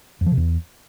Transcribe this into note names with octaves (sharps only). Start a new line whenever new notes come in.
F2
F3
C3
E2